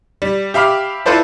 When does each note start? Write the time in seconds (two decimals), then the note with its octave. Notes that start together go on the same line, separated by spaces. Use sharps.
0.22 G3
0.54 G4 E5 F5 B5 D6 F6
1.06 E4 F4 A4 B4 C5 D5